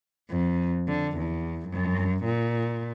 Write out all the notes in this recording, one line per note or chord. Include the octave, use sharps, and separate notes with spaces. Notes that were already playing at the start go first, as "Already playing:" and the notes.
F2
D3
E2
F#2
A#2